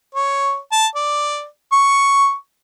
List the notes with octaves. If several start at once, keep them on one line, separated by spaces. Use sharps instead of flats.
C#5
A5
D5
C#6